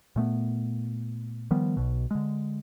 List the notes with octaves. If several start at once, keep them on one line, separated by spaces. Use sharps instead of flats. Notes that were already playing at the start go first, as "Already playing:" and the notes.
A#2 A3 B3
D#3 F3 G3 B3
B1 B2
D3 G#3